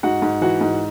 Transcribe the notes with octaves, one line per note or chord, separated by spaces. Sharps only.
G#2 F#4 F#5
G#2
E3 F#4 F#5
G#2